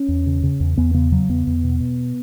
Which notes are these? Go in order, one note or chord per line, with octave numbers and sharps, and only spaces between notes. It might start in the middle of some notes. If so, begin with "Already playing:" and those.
Already playing: C#4
E2
C#3
C#3
E2
E2 B3
C#3 B3
C#3 F#3
E2 B3
E2
B2
B2